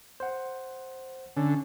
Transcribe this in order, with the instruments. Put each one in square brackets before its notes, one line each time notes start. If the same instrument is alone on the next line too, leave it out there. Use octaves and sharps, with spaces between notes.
[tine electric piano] C5 F#5
[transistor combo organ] D3 [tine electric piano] C#4